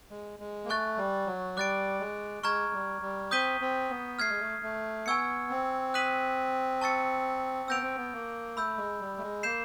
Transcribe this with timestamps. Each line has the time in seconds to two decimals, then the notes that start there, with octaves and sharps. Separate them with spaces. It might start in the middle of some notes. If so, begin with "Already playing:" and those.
0.10 G#3
0.40 G#3
0.65 A#3
0.69 A3 G#5 C#6 F#6 A6
0.98 G3
1.27 F#3
1.57 G3 D6 F#6 A6 D7
2.00 G#3
2.43 G#3 A#5 C#6 F6 G#6
2.73 G3
3.02 G3
3.31 C4 D#6 G6 B6 D#7 G7
3.61 C4
3.90 B3
4.19 A3 F6 G#6 C7
4.30 G#3
4.40 A3
4.63 A3
5.06 B3 G#5 C#6 E6 G#6 C#7
5.50 C4
5.94 D#6 F#6 B6 D#7 F#7
6.81 A5 C#6 E6 A6 C#7
7.68 B3 E6 G6 A#6 D7 F7
7.83 C4
7.96 B3
8.13 A#3
8.57 A3 B5 E6 G6
8.78 G#3
9.00 G3
9.17 A3
9.22 G#3
9.43 A#3 G6 C7 E7